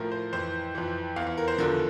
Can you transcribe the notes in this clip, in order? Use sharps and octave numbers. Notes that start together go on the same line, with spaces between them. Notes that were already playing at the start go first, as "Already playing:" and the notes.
Already playing: A2 F3 A#4
C5
F2 E3 C5
F2 E3
E2 E3 F5
F5
A#4
C5
E2 D3 F3 A#4